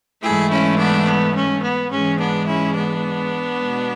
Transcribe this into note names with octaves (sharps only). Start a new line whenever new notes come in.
G#2 E3 A3 E4 G#4
C#4 E4
B3 D4
B3
C#4
B3
G#2 E3 G#3 C#4
B3 D4
C#4 E4
B3 D4
B2 G#3